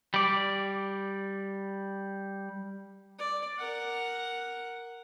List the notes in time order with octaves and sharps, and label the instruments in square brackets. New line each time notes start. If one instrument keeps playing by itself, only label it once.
[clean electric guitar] G3 D5
[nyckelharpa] D5
A#4 F#5